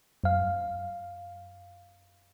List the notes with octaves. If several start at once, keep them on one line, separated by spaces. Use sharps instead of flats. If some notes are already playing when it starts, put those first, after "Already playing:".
F#2 F5